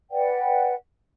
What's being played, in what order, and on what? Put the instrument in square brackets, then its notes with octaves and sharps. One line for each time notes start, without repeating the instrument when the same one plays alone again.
[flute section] B4 D5 F#5 G5